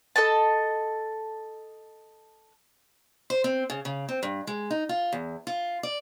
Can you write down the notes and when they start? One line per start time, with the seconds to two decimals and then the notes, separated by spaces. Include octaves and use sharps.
0.16 A4 D#5 A5
3.30 C5
3.44 C4
3.70 C#3
3.85 C#3
4.09 C4
4.23 G2
4.47 G#3
4.71 D#4
4.89 F4
5.13 E2
5.47 F4
5.83 D5